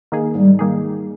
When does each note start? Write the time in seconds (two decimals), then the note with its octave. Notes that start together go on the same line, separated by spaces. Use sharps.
0.12 D#3 A#3 D#4 G#4
0.35 G#2 G3
0.59 D#3 A#3 D#4 G#4